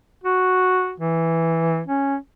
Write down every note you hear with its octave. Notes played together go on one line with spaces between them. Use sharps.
F#4
E3
C#4